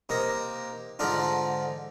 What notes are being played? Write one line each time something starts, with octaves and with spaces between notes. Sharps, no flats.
C3 A#3 D#4
G#2 D3 D4 D#4 F4